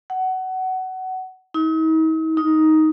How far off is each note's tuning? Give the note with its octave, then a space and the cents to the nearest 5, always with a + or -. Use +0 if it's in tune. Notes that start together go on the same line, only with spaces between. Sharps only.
F#5 +20
D#4 +45
D#4 +10